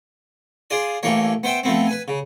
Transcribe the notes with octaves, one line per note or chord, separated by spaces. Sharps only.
F4 G#4 D5 D#6
A1 E3 A3 A#3 C#5
B3 C5 E5 G5
F3 A3 B3 C4
B4 G#5
C#3